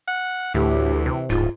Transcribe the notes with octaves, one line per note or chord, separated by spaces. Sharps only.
F#5
D2 A2 E3 G4
C3
D1 G#2 F4